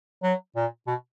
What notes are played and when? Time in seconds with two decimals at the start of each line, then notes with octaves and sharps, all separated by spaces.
0.23 F#3
0.56 A#2
0.87 B2